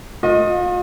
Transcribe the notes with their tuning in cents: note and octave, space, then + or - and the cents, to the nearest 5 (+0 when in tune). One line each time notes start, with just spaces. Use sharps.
F4 +40 D#5 +0